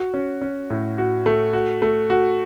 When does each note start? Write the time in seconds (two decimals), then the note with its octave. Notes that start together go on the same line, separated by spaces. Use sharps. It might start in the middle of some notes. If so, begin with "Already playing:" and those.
Already playing: F#4
0.14 C#4
0.41 C#4
0.70 A2
0.98 F#4
1.26 A3
1.53 F#4
1.82 A3
2.10 F#4